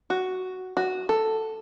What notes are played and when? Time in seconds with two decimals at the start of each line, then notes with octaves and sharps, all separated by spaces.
0.10 F#4
0.77 F#4
1.09 A4